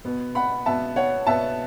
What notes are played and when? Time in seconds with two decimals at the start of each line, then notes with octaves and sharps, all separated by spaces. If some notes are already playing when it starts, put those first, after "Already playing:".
0.05 B2 B3
0.35 F#5 B5
0.66 B2 B3 E5 A5
0.96 C#5 F#5
1.27 B2 B3 E5 A5